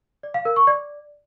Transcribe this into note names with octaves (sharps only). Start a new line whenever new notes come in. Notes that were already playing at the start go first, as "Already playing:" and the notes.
D5
F5
A#4
C#6
D5